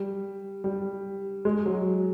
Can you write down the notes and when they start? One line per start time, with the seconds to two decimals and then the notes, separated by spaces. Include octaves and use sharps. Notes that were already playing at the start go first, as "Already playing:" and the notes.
Already playing: G3
0.64 G3
1.45 G#3
1.66 F#3